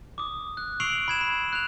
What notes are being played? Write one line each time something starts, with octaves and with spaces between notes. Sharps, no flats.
D6 D#6
F#6
C#6 E6 C7 D7 F7 F#7
B5 G#6 E7
B5
F#6 F7